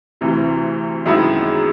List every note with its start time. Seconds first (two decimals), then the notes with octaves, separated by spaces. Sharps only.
0.21 D2 C3 E3
1.06 F#2 D#3 G#3 B3 E4